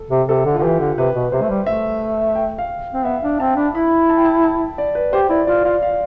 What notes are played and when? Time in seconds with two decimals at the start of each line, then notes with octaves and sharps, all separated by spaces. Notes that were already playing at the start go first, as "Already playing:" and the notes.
Already playing: A4
0.10 C3
0.28 C3 A4
0.45 D3
0.54 F4
0.58 D3
0.63 E3 G4
0.80 D3
0.97 C3 B4
1.15 B2
1.32 C3 C5
1.42 A3
1.49 G3
1.66 A3 E5
2.35 G5
2.58 F5
2.94 C4
3.05 B3 E5
3.23 D4 F5
3.40 C4 A5
3.56 D4 B5
3.74 E4 B5
4.09 A5
4.17 G5
4.25 A5
4.44 A5
4.78 D5
4.95 B4
5.13 G4 C5
5.29 E4 D5
5.47 F4 D5
5.64 F4 F5
5.82 F5